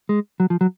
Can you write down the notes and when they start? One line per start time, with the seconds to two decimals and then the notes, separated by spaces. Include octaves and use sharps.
0.09 G#3
0.40 F#3
0.50 F3
0.61 F#3